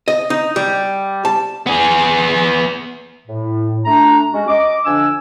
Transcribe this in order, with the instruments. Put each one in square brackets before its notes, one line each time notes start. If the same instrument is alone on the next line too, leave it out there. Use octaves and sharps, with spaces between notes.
[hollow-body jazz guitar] D#5
D#4
G3
A5
[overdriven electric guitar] B3 G#4
[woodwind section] A2
A3 D4 A#5
G#3 C#4 F#4
D#5 D6
F2 D3 D4 G#5 E6